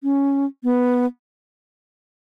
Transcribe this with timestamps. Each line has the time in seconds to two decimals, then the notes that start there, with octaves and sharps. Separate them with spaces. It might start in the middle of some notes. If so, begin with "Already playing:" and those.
0.03 C#4
0.64 B3